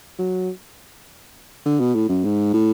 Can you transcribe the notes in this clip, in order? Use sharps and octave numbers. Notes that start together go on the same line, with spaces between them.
F#3
D3
B2
A2
F#2
G#2
A2